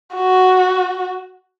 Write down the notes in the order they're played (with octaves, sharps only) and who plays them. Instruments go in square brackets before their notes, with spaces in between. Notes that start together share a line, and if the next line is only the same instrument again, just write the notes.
[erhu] F#4